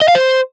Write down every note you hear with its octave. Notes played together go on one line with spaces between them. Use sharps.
D#5
F5
C5